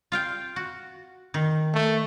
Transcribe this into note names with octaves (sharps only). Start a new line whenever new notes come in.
F4 F5 G5
F#4
D#3
A3